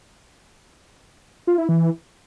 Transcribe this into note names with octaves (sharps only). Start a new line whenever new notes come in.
F4
E4
E3